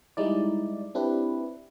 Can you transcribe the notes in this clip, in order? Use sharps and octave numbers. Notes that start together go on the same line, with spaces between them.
G3 G#3 D#4 E4 D5
C4 D4 E4 G4 B4